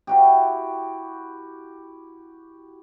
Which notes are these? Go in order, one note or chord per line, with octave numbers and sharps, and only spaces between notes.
E4 F#4 G4